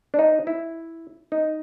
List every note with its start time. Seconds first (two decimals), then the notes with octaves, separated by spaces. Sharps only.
0.14 D4
0.19 D#4
0.47 E4
1.32 D#4